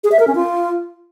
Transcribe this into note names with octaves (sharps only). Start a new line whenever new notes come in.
G#4
E5
A#4
C#4
F4